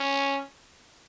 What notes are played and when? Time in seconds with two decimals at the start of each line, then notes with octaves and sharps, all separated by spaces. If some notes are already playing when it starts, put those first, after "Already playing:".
Already playing: C#4